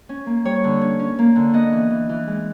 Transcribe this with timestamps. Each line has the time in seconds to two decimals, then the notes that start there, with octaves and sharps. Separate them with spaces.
0.09 C#4
0.26 A#3
0.45 G3 C#5
0.64 D3
0.81 C#4
0.99 C#4
1.19 A#3
1.36 D3
1.54 B3 D#5
1.72 E3
1.90 E3
2.09 E3
2.27 G#3